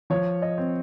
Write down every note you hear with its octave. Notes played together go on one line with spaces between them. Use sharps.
F3 C#5
D#5
C4